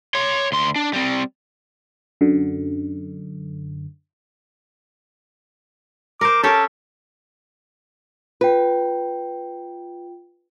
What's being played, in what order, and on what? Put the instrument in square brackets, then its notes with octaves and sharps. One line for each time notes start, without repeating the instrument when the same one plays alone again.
[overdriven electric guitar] C#5 C6
D2 C6
D4
G3 C4
[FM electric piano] F#2 D3
[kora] A#4 C5 [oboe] D6
[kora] C#4 G4 A4 [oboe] A5
[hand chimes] F4 G5 [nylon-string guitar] B4